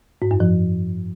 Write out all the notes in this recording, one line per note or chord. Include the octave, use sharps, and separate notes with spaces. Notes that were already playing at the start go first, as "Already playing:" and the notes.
G#2
F#2
F3